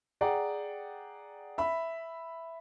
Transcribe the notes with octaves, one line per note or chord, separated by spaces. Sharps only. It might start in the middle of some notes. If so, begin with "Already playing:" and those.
G#4 D5 F#5 G5 A#5
E5 B5